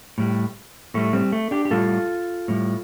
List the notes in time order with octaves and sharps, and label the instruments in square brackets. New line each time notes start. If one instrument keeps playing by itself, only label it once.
[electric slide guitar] A2 G3
A2 G3 A3
G3 C4
A3
D4 G4
G4
A2 G3 F4 A4
A2 G3